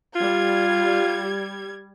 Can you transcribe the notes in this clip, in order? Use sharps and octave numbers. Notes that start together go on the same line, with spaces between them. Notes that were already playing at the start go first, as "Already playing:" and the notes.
G3 F4 G#6